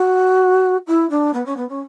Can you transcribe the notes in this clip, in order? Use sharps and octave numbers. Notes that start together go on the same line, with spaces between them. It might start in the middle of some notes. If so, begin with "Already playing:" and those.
Already playing: F#4
E4
D4
B3
C#4
B3
C#4